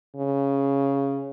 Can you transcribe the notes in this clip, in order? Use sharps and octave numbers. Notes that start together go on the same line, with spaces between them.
C#3